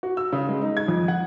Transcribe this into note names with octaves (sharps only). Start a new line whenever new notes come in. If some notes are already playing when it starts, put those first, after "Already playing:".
F#4
E6
C#3
G#3
D#4
G#6
F2
F#5